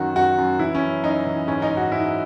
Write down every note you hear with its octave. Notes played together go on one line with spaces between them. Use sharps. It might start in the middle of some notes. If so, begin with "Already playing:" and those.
Already playing: F#2 D#3 F#4
F#2 F#4
F#2
E3 E4
C#4
F#2
F#2 D#4
E3
G#2 C#4
D#4
G#2
F#4
G#2 E4